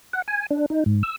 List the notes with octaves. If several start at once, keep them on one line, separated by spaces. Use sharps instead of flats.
F#5
G#5
D4
D#4
G#2
E6